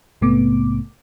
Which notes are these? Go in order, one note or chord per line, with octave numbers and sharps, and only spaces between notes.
A#1 G#2 C3 A3 B3 D6